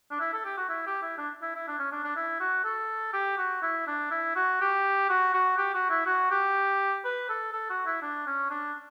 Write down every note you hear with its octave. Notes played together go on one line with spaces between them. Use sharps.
D4
E4
A4
G4
F#4
E4
G4
E4
D4
E4
E4
D4
C#4
D4
D4
E4
F#4
A4
G4
F#4
E4
D4
E4
F#4
G4
F#4
F#4
G4
F#4
E4
F#4
G4
B4
A4
A4
F#4
E4
D4
C#4
D4